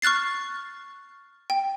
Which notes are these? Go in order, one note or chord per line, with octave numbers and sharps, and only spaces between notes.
C#6 F6 F#6 A6 C7
G5